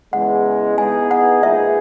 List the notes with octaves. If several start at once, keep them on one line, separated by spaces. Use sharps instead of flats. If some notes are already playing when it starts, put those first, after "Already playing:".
E2 C#3 G#3 F#5
E3 B3 D#4 G#4 G#5
F#5
A#2 G#3 D#4 G#4 B4 E5